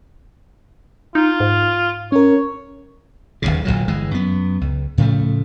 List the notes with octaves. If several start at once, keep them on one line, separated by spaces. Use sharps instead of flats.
D#4 F4
G#2
C#4 A#4 C#5
D1 A1 D#2 C#3
G1 C#2 A#2 F#3
G1 E3 G#3
F#2 B3
C#2
A2 C#3 F3 A3